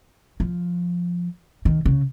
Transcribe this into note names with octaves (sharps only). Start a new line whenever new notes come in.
F3
D#3
C#3